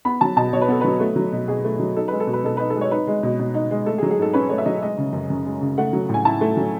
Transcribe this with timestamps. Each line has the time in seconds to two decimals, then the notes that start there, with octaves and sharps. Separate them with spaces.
0.05 B3 B5
0.21 F#3 A5
0.36 B2 A5
0.53 B2 C#5
0.61 B4
0.68 B3 A4
0.81 F#3 B4
1.00 A3
1.16 F#3
1.32 B2
1.48 B2 G#4
1.64 A3
1.79 F#3
1.96 D#4 A4
2.08 G#3 B4
2.20 A4
2.27 B2
2.33 B4
2.44 B2 A4
2.57 D#4 B4
2.70 A4
2.75 G#3
2.81 C#5
2.91 D#4 B4
3.07 G#3
3.23 B2
3.39 B2
3.54 D#4
3.71 G#3
3.86 A3 A4
3.98 G#4
4.03 F#3
4.11 G#4
4.19 G#2 A4
4.34 C#4 B4
4.49 A3 C#5
4.58 E5
4.65 F#3 D#5
4.82 G#3 D#5
4.98 C#3
5.13 F#2
5.30 F#2
5.45 G#3
5.61 C#3
5.78 A3 F#5
5.93 F#3
6.09 A2
6.14 G#5
6.25 E4 A5
6.41 A3
6.57 F#3